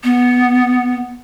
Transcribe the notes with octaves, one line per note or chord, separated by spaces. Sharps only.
B3